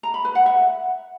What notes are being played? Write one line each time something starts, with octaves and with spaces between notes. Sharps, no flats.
A#5
B5
B4
F#5
E5